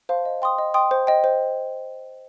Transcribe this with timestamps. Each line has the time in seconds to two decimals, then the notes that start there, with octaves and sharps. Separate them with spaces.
0.09 C5 F5 A5 C6
0.25 D#5
0.42 G5 C6 D#6
0.58 D#5
0.74 G5 C6 D#6
0.91 C5
1.07 D#5 G5
1.24 C5